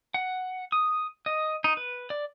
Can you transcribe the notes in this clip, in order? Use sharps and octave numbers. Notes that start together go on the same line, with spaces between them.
F#5
D#6
D#5
D#4
B4
D5